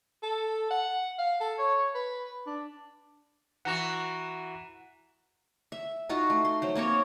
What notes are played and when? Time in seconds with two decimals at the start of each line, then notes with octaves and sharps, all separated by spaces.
0.23 A4
0.70 F#5
1.19 F5
1.41 A4
1.58 C#5
1.95 B4
2.46 D4
3.65 E3 F#4 F#5 A#5
5.72 E5
6.09 D#4 F4 F#4
6.30 A3
6.45 C6
6.62 F#3 C5
6.75 A#3 C4 A#4 C#5